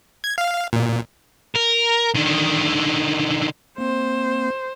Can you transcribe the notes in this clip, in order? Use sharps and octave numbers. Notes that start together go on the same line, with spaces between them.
G#6
F5
A#2
A#4
D3 D#3
A#3 C4 C5